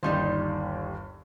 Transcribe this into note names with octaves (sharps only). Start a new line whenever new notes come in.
G1 D#2 G3 D#4 C5